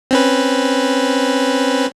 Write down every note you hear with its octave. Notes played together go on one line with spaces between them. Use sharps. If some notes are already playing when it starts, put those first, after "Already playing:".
C4 C#4 B4